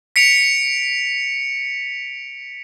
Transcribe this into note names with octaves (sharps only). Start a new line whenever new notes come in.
B6 C#7 D7 F7